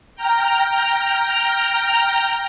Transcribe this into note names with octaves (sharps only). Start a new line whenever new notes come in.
G5 A#5 F6